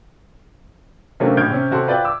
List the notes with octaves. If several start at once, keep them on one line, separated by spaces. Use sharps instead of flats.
C3 F#3 A3 A#3 C#4 D4
A#1 A2 F6 G6 G#6 D7
C3 C#4
C3 F#4 A4 C6
F4 B4 D5 E5 G5
D6 E6